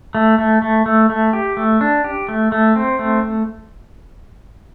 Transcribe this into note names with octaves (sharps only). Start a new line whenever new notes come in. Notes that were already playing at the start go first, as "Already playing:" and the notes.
A3
A3
A3
A3
A3
G4
A3
D4
G4
A3
A3
C4
A3